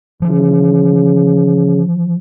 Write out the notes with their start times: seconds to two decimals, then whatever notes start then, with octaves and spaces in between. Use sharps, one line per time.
0.22 C#3 E3 F3